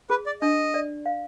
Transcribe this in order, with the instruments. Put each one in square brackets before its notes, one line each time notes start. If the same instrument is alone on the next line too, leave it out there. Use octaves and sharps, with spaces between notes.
[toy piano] G#4 [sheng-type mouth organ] B4
[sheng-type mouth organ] D5
[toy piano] D4 [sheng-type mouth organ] D#5
[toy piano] D5
F5